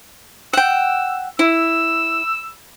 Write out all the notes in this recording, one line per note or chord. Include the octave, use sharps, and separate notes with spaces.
F#5 G5 E6
E4 E6